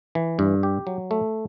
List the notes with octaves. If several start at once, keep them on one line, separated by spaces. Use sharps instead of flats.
E3
G2
G4
F#3
A3